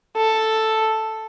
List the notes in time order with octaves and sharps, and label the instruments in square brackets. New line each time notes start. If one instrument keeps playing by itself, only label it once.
[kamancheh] A4